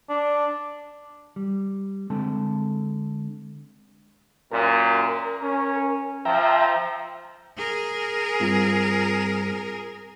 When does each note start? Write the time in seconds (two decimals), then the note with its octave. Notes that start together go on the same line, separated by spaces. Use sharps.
0.09 D4
1.36 G3
2.10 D3 G#3 C4 A4 A5
4.51 F#2 A#2 A#4
5.43 C#4
6.25 F3 E5 G5 A#5
7.57 G#4 A#4
8.40 G2 C4 F4